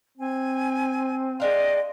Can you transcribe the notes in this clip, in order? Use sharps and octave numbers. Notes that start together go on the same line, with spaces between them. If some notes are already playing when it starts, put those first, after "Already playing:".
C4 G#5
G#3 D4 D#5 F5 G5 C6